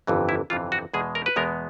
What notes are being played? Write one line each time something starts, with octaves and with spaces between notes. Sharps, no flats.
G1 F2 C3 E3
E4
G1 F2 C3 E3 F4
F#4
E2 B2 G#3 B3 G#4
A#4
B4
E2 B2 G#3 B3 A#4